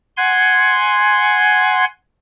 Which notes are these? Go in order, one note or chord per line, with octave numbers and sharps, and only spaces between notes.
F#5 G#5 C6 G#6